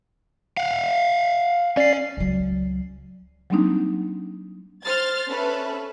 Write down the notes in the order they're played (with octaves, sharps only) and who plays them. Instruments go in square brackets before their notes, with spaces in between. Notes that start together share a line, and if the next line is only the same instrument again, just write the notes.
[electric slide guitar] F5 F#5
[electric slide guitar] C#4 [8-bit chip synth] D5 C7
[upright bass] C#2 F#3
[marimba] F#3 G3 A#3 C4 D4 D#4
[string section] C5 F6 A6
C#4 A4 B4 E5